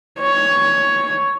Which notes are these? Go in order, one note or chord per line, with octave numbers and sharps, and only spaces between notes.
C#5